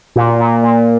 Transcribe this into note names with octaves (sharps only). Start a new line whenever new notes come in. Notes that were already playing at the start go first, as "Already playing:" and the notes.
A#2
A#2
A#2